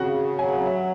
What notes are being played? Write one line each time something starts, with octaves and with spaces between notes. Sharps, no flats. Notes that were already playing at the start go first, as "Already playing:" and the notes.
Already playing: C#3 F#4 F#5
F#3 G#5
F#5
E5